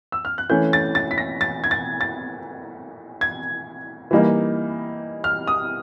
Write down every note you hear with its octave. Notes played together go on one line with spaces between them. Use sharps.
E6
F6
F#6
E3 A3 C#4 G6
A6
A6
B6
A#6
A6
G#6
A6
A6
G#6
E3 G3 A#3 D#4
F6
D#6